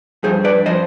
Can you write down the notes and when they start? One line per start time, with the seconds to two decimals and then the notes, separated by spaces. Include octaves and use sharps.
0.23 G2 F3 G#4 C5
0.44 B4 D5
0.66 F3 C5 D#5